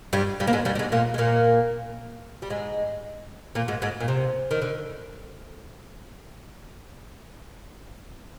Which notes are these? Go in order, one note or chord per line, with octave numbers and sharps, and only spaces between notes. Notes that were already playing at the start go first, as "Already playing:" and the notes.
G2 G3
G2 G3
A#3
G#2 G#3
G2 G3
G3
G#2 G#3
A#2 A#3
G#3
A#2 A#3
G3
G#2 G#3
A#2 A#3
G#2 G#3
G#2 G#3
A#2
C3
D#3
D3